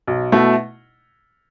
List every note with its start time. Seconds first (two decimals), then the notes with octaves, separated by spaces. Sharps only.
0.07 B1
0.32 B2 A3 E4